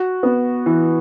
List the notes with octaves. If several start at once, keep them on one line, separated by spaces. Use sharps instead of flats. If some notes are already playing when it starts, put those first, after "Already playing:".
Already playing: F#4
B3
E3